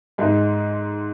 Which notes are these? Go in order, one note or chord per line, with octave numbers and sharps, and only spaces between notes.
G#2 G#3